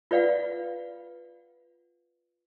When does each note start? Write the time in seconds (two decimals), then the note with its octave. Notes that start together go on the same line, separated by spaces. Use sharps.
0.11 F4 B4 D5 F5 F#5